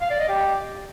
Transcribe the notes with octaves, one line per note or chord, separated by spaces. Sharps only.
F5
D5
D#5
G4